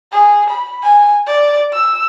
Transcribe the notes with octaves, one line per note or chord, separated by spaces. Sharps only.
G#4
B5
G#5
D5
E6